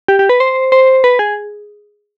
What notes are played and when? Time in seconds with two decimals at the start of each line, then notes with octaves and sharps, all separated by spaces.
0.08 G4
0.19 G4
0.29 B4
0.40 C5
0.72 C5
1.04 B4
1.19 G#4